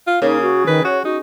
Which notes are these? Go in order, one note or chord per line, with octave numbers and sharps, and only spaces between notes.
F4
C#3 A#3 D#4
F#4
D#3 B4
F#4 C#5
D#4 F#4